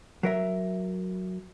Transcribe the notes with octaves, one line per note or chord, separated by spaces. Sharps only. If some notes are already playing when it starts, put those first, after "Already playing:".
F#3 A#4 E5